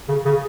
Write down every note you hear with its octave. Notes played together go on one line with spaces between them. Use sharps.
C#3
C#3